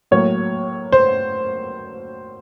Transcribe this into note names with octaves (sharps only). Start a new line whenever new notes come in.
A2 F#3 A#3 C#5
C5